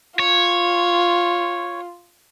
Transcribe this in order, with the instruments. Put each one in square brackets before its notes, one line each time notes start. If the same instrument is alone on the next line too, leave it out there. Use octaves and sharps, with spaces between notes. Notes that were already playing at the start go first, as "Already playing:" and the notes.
[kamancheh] F4 [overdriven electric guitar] C#5